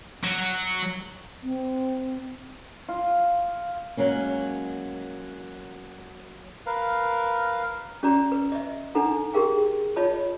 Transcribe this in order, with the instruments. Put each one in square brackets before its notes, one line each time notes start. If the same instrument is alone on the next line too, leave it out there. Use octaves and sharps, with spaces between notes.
[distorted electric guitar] F#3
[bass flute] C4
[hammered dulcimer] F4
[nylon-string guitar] F#3 G#3 A#3 C#4
[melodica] A#4 B4 F5
[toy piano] C#4 F#4 D5 A#5
B4
D#5 E5
D4 D#4 A4 F#5 A#5
G4 G#4 A#4 F5 G5
F4 C#5 D#5 A5 B5